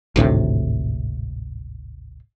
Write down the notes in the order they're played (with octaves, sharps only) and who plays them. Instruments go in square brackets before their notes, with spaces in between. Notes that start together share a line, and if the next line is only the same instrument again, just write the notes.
[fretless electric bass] G#1 D2 A2 C3